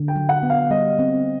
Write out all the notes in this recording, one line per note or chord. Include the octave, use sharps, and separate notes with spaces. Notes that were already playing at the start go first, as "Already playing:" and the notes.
Already playing: D3
G5
F#3
F#5
B3
F5
G3 D#5
C4